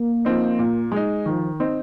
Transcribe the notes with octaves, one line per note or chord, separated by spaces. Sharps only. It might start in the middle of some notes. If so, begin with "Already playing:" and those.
Already playing: A#3
F3 C4 D#4
A#2
G#3 D#4
D#3 F3
C4 D#4